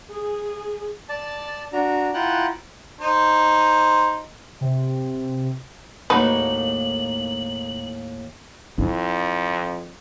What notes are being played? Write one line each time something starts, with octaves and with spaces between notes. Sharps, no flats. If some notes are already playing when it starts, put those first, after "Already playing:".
G#4
D5 A5
D4 F#4 A#5
E4 F4 F#5 G5 A#5 F#6
D#4 C5
C3
D#2 A2 A#3 D#4 F#4 B4 F#7
F2 E4